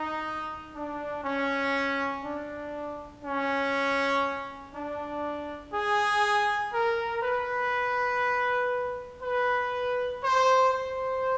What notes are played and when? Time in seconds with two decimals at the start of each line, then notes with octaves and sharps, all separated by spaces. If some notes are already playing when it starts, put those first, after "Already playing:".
Already playing: D#4
0.73 D4
1.23 C#4
2.22 D4
3.23 C#4
4.73 D4
5.72 G#4
6.72 A#4
7.22 B4
9.22 B4
10.22 C5
10.72 C5